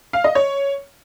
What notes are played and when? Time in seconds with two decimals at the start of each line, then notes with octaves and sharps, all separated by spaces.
0.13 F5
0.24 D#5
0.35 C#5